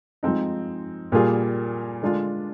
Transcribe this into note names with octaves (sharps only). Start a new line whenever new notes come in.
F3 G#3 C4 D#4
A#2 G3 A#3 F4 G#4
D3 G#3 D4 F4